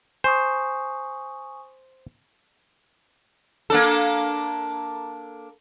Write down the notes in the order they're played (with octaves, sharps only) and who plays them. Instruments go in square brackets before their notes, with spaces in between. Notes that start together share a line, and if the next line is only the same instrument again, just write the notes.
[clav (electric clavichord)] C5 [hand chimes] G#5 C#6 D#6
[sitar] A#3 D4 A4